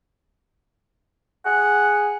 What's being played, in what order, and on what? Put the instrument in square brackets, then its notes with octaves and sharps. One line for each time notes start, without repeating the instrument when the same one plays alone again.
[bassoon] G#4 [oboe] F#5